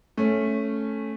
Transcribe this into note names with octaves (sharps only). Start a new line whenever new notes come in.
A3 C#4